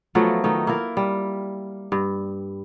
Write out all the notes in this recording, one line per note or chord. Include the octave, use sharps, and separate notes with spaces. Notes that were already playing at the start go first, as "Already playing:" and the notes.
F3 F#3 A3 B3
D#3 A3 D#4
A#3 E4 F4 A#4
G3
G2